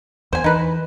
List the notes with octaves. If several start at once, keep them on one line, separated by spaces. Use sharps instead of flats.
E2 C5 G#5
E3 D#4 B4